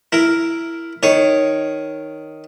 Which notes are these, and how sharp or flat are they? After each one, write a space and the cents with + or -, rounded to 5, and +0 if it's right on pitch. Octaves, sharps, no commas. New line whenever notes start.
E4 +10 A#4 +0
D#3 +0 C#5 +0